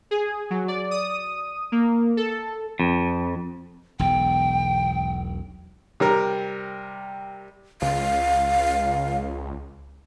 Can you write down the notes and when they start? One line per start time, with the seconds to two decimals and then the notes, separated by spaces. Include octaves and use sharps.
0.11 G#4
0.50 F#3
0.68 D5
0.91 D#6
1.72 A#3
2.17 A4
2.80 F2
3.99 E1 B1 G5
6.00 C3 G3 A#4 A#5
7.82 C#2 F5